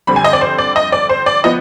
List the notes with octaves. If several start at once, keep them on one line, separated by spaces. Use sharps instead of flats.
F2 D3 G3 C4 B5
G#5
D#5
D5
C5
D5
D#5
D5
C5
D5
F3 B3 D#5